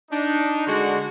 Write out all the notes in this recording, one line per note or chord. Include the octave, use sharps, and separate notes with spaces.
D4 D#4
D3 G#3 F#4